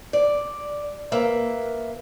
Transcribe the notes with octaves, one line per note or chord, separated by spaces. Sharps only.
D5
A#3 B4 E5